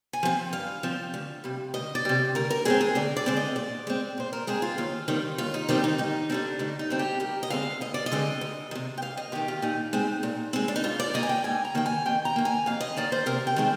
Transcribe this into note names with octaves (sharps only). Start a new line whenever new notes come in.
G#5
F3 C4
G2 F5
F3 C4
D2
C3 G3
D2 D#5
D5
C3 G3
D2 A#4
A#4
D3 G#3 C4 G#4
G#4
D2 D5
D5
D3 G#3 C4
D#5
A#2 D5
G#3 C4
A#2 C5
A#4
G#3 C4 G#4
F4
D#2 F4
D#3 G3 C4
D#2 F4
D#4
D#3 G3 C4 G4
D#4
D2 D#4
D3 G3 C4 D4
D2 D#4
D#4
D3 G3 C4
G4
D2 A#4
D#5
D3 G#3 C4 F5
D2 D#5
D5
D#5
D3 G#3 C4
D2
D#3
C3
G5
D2 F5
D#5
C3 D#3 G4
F4
A#2 D#4
G#3 C4
A#2
G#3 C4
D4
D#4
G#2 F4
D5
D#3 A#3 D#5
G#5
G5
G#2 G#5
A#5
D#3 A#3 G5
G#5
F2 G5
A#5
D#3 A#3
G#5
F2 F5
D#5
D#3 A#3 D5
C5
C3 A#4
G5
D#3 G#3 C4